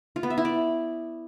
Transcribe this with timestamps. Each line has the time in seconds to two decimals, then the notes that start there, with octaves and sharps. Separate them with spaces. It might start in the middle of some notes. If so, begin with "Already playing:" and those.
0.16 F4
0.23 B3
0.30 E5
0.38 E4
0.45 D5